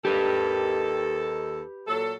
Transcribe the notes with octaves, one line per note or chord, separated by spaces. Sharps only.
D#2 D#3 G4 A4 B4
A#2 F#3 A4